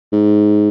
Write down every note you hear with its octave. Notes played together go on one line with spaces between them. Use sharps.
G#2